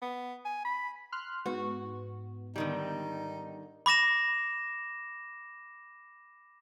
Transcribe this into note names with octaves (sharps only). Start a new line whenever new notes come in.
B3
G#5
B5
C6 F6 F#6
G#2 B3 F#4
D3 D#3 G3 D#4
B5 D6 A#6 E7